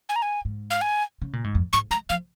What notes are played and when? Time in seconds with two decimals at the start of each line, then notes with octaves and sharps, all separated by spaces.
0.09 G#5
0.16 A#5
0.22 G#5
0.45 G#2
0.70 F5
0.81 G#5
1.22 C#3
1.33 A#2
1.44 G#2
1.55 F2
1.73 G#2 C#6
1.91 G#3 A#5
2.09 F3 F5